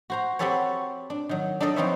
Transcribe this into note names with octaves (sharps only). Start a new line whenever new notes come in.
F#4 C5 A#5
C4 F#4 G4 A4 B4 C#5
D4
D#3 F#3
D4 D#4 A4 D5 D#5
F3 C4 D#4 B4 C#5 E5